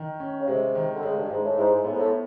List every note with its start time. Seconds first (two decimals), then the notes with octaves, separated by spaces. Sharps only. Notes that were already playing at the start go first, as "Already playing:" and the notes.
Already playing: D#3
0.20 C#4
0.40 C#3
0.48 C3 G#3
0.75 D#3
0.95 D3
1.03 C#3 G#3
1.16 G2
1.30 G#2 G#3
1.44 A2
1.57 G#2 E4
1.71 G#2
1.84 A2 B3
1.92 G#2
1.98 A2